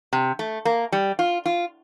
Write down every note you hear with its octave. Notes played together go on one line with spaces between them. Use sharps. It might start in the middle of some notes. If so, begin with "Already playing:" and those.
C3
A3
A#3
G3
F4
F4